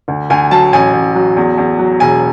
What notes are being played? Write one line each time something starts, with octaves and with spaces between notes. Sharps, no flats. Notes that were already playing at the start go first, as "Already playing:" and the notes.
D2
D2 G#5
F#3 A5
A1 G#5
A1
F#3
E2
E2
F#3
E1 G#5